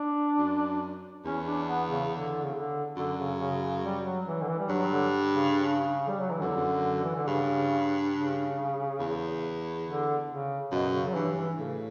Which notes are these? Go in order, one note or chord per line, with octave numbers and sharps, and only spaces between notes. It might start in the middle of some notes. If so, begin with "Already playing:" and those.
Already playing: D4
F#2
E2 C#4
D4
B3
C#3
D3
C#3
D3
F#2 D3
C#3
C#3
C#3
G3
F#3
E3
D3
E3
G3
G2 F#3
D3
C#3
C#3
G3
F#3
E3
F#2 D3
E2
F#2
E3
D3
G2 C#3
C#3
E2
D3
C#3
F#2 B2
C#3
F#3
G2 E3
E3
A2 C#3